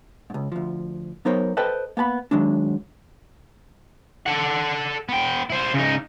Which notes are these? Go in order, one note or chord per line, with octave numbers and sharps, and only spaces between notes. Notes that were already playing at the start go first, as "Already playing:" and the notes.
C#2 G#2
D2 F3
F#3 B3 D#4 A#4 C5 C#5
A4 B4 C5 D#5 G5 A5
A#3 B3 A5 B5
D#3 F#3 G#3 D4
A4 F#5
B3 G5
E4 C5
C#3 D#4